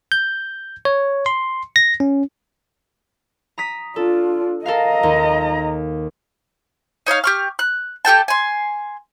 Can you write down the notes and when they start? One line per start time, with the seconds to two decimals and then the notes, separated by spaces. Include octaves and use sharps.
0.12 G6
0.85 C#5
1.26 C6
1.76 A#6
2.00 C#4
3.58 A#5 D#6 B6
3.96 D4 F4 A4
4.66 A4 A#4 D#5 F5 A#5
5.03 D#2
7.06 D#4 C#5 D#5 F5
7.24 G4 C#6 F6
7.59 F#6
8.05 G4 A4 G5 A5
8.28 G#5 C6